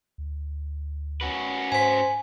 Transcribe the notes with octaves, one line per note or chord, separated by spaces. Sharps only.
D2
C#4 F#4 B4
G#2 C5 G#5 B6